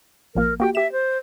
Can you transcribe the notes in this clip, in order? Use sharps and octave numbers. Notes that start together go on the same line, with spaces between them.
A1 F3 A#3 A#4
A#3 F#4 G4 G5
G4 E5 E7
C5